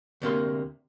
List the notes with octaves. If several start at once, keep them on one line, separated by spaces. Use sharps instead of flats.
D2 C3 A#3 C6